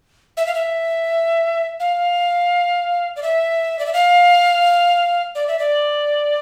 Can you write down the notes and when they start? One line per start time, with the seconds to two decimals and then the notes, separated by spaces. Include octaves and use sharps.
0.37 E5
0.47 F5
0.55 E5
1.80 F5
3.16 D5
3.23 E5
3.79 D5
3.86 E5
3.93 F5
5.35 D5
5.48 E5
5.59 D5